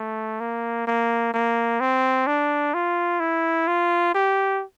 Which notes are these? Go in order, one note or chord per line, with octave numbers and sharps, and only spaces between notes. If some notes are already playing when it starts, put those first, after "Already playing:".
Already playing: A3
A#3
A#3
A#3
C4
D4
F4
E4
F4
G4